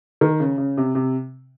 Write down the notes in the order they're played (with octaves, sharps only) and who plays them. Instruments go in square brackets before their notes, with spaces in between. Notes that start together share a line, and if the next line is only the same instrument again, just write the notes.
[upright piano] D#3
C#3
C#3
C3
C3